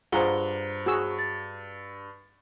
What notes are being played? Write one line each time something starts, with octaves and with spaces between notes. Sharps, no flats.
G2 F4 G#4 C5 F#5 A#5 G7
F#4 G#4 E6
A6